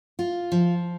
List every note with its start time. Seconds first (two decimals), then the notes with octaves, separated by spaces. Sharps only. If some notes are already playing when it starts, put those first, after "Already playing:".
0.19 F4
0.52 F3